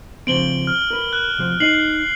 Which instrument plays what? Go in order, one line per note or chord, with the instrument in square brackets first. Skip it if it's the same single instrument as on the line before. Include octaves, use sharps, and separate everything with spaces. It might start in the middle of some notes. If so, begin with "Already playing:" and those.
[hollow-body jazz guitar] C#3 F3 C4 [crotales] D7 F#7 G7
[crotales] F6
[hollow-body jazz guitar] A#4 B4
[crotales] F#6
[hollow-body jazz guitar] C3 F3
[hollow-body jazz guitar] D#4 D#5 [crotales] C7 F#7